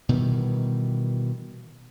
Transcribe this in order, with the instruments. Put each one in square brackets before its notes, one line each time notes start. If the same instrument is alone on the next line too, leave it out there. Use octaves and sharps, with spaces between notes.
[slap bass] B2 D#3 E3 G3